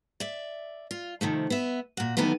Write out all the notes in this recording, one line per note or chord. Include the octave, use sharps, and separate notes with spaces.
D5 E5
F4
C3 D#3 F3 A3
B3 E5
A#2 F#4
D#3 E3 F#3 A3 B3